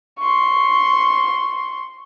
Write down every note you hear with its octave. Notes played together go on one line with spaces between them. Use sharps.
C6 C#6